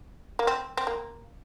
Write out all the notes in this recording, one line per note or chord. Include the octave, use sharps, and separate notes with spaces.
A#3
C4
C4
A#3